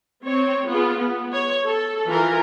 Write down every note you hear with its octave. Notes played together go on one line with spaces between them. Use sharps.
C4 C#5
B3 F4 G#4
B3
C#5
A4
E3 F4 A#4